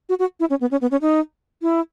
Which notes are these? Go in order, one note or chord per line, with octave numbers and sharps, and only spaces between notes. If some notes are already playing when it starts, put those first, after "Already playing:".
F#4
F#4
E4
C#4
B3
C#4
B3
C#4
D#4
E4